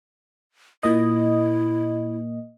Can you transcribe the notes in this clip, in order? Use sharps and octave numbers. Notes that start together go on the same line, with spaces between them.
A#2 A#3 E4 D#5